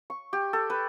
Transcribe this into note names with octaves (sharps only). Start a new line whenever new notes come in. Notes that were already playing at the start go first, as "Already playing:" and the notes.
C#6
G4
A4
B4